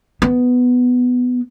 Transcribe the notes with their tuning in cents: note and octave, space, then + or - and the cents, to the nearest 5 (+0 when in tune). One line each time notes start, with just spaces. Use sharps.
B3 +5